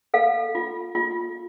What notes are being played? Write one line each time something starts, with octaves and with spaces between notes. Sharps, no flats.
A4 F5
F4
F4